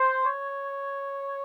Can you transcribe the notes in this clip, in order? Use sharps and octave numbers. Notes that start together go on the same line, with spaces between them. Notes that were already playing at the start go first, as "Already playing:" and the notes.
Already playing: C5
C#5